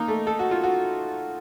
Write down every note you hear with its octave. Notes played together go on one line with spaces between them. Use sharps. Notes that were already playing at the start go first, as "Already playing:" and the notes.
Already playing: A#3 D#4
A3
A4
F#4
F4
F#4